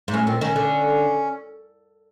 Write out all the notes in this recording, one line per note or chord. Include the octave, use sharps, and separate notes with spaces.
G#2
A2 C#4
A#2 C4
D#3 C#4
D3